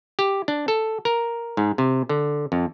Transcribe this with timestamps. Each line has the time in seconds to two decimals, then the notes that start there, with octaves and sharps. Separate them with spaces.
0.19 G4
0.48 D4
0.68 A4
1.05 A#4
1.57 G#2
1.78 C3
2.09 D3
2.52 F2